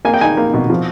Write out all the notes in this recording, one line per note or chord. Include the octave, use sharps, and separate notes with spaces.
A#3 G#5
G5
D#4 G#5
A#3
B2
F3